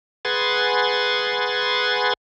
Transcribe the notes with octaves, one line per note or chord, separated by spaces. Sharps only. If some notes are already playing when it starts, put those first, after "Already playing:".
G#4 B4 F#5 C6 G#6 A6